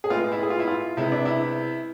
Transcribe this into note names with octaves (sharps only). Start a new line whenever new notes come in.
G#4
A2 G#3 B3 F4
E4
G#4
F4
E4
F4
C3 G#3 B3 E4
D4
E4